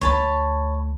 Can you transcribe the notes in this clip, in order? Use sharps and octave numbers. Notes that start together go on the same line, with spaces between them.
D2 C#5 A5 B5